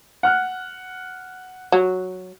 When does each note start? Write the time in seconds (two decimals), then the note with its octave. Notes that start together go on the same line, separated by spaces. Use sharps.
0.23 F#5 F6 F#6
1.72 F#3